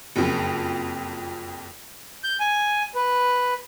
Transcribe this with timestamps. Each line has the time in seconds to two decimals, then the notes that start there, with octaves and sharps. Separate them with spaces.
0.16 F#1 F2
2.24 G6
2.40 G#5
2.95 B4